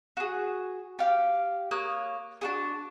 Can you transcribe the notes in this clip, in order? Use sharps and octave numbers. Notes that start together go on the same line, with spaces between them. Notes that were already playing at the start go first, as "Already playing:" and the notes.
F#4 G#4
G4 F5
A#3 C#5 D#6 F#6
D4 F#4 G#4